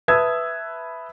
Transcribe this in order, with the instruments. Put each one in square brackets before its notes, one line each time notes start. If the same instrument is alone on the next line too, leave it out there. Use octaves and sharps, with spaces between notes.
[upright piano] B4 E5 A5 D#6 E6 G#6